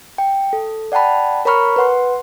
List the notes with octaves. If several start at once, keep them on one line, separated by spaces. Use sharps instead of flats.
G5
A4
D5 F#5 G5 A5 B5
A#4 C#5 A#5 B5 C#6 F6
B4 F#5 C6